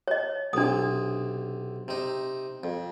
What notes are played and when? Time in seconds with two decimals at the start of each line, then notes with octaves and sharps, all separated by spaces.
0.08 C#5 D#5
0.53 B1 C3 D4 D#6
1.88 C3 D#4
2.63 F2